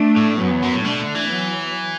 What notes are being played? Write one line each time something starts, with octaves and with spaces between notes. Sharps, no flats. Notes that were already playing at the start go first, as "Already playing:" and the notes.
Already playing: A3 D4
A2
F#2 F#3 B3
E2
F#2
A2
B2 A3 D4
D3
E3
F#3 B3